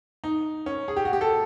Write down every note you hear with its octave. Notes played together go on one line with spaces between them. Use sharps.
D#4
C#4
G#4
G4
F#4
G4
A4